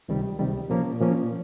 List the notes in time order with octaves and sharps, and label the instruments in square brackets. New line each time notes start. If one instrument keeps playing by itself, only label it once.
[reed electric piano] C#2 C3 D#3 G3
C#2 C3 D#3 G3
A#2 F3 A#3 C#4
A#2 F3 A#3 C#4